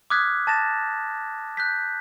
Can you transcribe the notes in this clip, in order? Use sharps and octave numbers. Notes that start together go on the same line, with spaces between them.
D6 D#6 F6 F#6 G#6 B6
A5 A6 A#6 E7
F#6 G6 B6